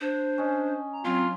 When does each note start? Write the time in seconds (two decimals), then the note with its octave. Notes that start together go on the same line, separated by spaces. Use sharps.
0.01 D4 C5
0.38 C#4 D#5
0.93 A#5
1.05 F#3 C4 F4